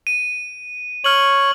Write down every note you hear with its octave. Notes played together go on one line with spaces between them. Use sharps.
D#7
C#5 C#6 F6 F#7